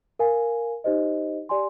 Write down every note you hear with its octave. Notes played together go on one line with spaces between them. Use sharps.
A#4 F5 G#5
D#4 G4 C5 D#5
G4 D5 G#5 C6